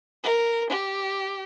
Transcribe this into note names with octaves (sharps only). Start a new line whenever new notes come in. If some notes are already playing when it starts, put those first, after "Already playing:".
A#4
G4